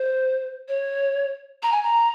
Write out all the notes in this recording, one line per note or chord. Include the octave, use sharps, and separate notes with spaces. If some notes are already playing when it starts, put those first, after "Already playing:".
Already playing: C5
C#5
A#5
G#5
A#5